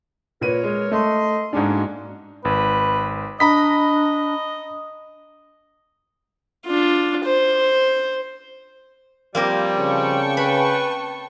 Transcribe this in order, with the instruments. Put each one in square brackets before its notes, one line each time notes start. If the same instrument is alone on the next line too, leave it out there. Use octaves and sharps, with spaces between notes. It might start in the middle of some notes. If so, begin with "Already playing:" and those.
[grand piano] A#2 B4 D#7 [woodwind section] A#4 C#5
[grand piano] G#3
[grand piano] A3 [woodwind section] D#5 C6
[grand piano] G#2 G#3 D4 [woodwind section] A#3 C#4 F#4
[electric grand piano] G#1 [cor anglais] B4
[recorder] D4 [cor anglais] D#5 [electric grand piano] A#5 B5 B6
[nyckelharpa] D4 F4
C5
[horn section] F3 G3 [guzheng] A#3 C4 A#4
[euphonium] C#3 [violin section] G5 A5 C#6
[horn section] B4 [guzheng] B5